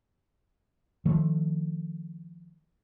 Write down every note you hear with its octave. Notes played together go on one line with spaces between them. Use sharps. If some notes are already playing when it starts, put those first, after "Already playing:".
D#3 F3 A3